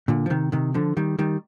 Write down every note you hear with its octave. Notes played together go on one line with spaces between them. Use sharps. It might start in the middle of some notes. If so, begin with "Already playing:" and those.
A#2 D3
F3
C3 D#3
C3 D#3
D3 F3
D#3 G3
D#3 G3